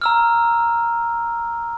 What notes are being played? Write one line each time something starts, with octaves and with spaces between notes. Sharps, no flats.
A#5 E6 F6